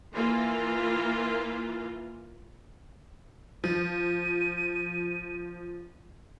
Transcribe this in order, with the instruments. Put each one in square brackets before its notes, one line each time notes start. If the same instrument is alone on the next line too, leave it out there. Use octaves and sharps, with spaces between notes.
[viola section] E3 A#3 F4
[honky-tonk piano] F3 [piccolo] D#7